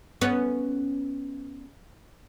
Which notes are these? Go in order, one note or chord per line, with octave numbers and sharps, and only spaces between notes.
B3 C#4